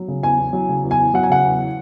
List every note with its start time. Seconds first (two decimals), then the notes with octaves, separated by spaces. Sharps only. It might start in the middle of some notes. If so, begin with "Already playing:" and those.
Already playing: F#3
0.08 C#3
0.23 E2 G#5
0.39 E2
0.53 F#3
0.69 C#3
0.84 E2
0.91 G#5
0.99 E2
1.14 F#3 F#5
1.23 G#5
1.30 C#3 F#5
1.45 E2